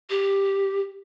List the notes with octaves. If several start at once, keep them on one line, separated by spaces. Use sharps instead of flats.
G4